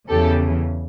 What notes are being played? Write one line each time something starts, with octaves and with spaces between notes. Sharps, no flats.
E2 C#3 E3 G4 A4